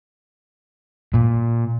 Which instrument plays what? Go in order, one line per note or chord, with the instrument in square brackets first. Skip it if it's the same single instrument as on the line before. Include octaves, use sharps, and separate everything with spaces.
[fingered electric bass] A#2